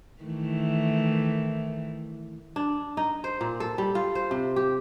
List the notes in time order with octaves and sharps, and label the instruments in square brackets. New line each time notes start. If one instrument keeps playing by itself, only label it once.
[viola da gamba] D#3 E3 A3
[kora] D4
D#4
C5
A#2
A4
G3
F4
C5
C3
G4